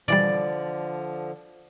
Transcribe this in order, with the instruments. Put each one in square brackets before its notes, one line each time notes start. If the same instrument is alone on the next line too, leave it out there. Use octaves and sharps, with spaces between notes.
[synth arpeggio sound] B2 E3 G3 [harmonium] D3 F3 [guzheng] D5